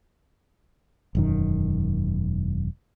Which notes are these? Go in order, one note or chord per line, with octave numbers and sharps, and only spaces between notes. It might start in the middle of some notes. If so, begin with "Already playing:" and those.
E1 F#2 D#3